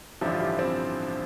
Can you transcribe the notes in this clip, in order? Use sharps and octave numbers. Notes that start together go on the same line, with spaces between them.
A1 G2 D3 F3 E4 G4
F4
E4 G4
C4 E4